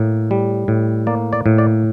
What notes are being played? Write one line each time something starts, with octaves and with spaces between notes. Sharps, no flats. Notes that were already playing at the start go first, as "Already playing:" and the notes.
Already playing: A2 A#3
G3
A2
A#3 D5
D5
A2
D5